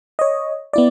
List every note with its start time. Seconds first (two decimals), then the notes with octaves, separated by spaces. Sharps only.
0.19 C#5 D#5
0.73 B3 E4 D5